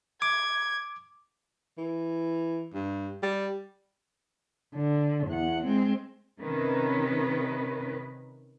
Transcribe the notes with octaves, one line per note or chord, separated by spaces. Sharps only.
D6 G#6
E3
G2
G3
D3
E2 F#5
G#3 C4
C3 D#3 C#4 B4